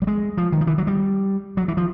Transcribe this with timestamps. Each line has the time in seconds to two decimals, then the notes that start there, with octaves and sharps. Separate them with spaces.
0.02 G3
0.07 G#3
0.37 F3
0.52 D#3
0.61 F3
0.67 E3
0.78 F#3
0.87 G3
1.57 F#3
1.68 E3
1.77 F3